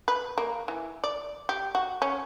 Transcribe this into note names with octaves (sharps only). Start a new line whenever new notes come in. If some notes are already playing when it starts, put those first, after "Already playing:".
B4
A#3
E3
D5
G4
F#4
C#4